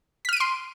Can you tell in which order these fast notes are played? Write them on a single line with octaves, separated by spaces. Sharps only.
B6 F6 D#7 D7 C6